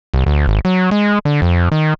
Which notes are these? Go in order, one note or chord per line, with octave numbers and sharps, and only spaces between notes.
C2
D2
G#1
F#3
G#3
D3
F2
D#3